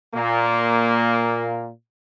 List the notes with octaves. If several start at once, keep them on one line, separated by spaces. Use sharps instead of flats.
A#2 A#3